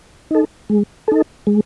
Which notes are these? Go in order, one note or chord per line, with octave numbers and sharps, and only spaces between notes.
D#4 A4
G#3
D#4 A4
G#3